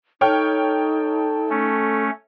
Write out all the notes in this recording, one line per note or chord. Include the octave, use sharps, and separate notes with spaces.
D#4 A4 C#5 G5 F6
A3 C#4